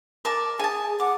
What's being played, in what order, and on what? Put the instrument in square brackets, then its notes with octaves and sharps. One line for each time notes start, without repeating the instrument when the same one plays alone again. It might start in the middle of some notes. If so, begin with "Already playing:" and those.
[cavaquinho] A#4 D5 A5
[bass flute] G#4 [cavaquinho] G#5 A5
[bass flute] F#5 [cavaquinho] D6